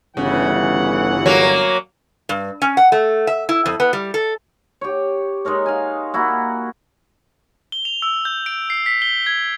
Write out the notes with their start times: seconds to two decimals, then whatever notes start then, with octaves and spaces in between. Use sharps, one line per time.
0.17 G1 C#3 E3 F#5
1.26 F#3 A#3 C#5
2.29 G2
2.62 C#4
2.77 F#5
2.92 A3
3.27 E5
3.49 E4
3.66 F2
3.80 B3
3.93 G3
4.14 A4
4.81 G4 C#5
5.45 G#3 D#4 A#4 C#5
5.66 F5 G#5
6.14 A#3 E4 F#4
7.72 G7
7.85 F7
8.02 E6
8.25 G6
8.46 D7
8.70 C7
8.86 B6
9.02 G7
9.27 G#6